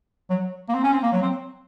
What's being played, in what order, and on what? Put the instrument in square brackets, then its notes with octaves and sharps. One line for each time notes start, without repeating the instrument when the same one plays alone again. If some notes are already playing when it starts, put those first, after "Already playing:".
[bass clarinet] F#3
A#3
C4
C#4
C4
A#3
F#3
C4